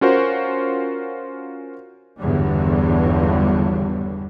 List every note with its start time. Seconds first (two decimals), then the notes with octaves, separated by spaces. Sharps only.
0.01 C#4 F4 F#4 A#4 C5
2.20 G1 E2 G2 D3 F#3 G3